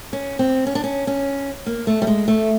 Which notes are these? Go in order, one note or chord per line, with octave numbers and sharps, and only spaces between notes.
C#4
C4
C#4
D4
C#4
C#4
A#3
A3
G3
G#3
A3